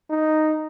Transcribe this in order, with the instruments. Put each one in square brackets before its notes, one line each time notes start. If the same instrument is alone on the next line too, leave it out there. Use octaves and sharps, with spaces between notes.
[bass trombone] D#4